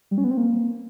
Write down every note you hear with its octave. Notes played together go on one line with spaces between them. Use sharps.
G3
C#4
B3
C4
A#3